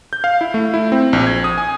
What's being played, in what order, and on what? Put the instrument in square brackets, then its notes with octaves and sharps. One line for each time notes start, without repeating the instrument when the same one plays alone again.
[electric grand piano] G6
F5
E4
A3
E4
C4
A#1
G#6
D#6
G#5